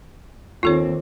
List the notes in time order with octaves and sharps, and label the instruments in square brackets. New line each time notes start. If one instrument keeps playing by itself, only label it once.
[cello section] D#2 C4 [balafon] F4 A4 C#5